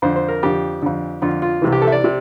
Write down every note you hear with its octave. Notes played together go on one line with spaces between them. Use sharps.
F2 D3 C5
C5
A#4
F2 D3 G4
F2 D3
F2 D3 F4
F4
C2 C3 E3
G4
A4
E5
D5
C3